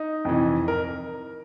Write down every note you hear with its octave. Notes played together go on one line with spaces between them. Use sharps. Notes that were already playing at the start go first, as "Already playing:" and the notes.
Already playing: D#4
F2 C3 E3
A#4